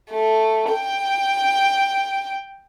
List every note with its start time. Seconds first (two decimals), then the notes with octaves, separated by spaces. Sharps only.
0.11 A3
0.72 G5